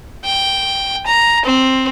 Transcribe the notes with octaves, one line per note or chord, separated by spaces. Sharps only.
G5
A#5
C4